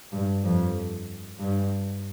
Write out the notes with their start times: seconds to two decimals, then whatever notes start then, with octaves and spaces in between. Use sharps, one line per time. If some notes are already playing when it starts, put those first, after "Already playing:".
0.12 G2
0.44 F2
1.40 G2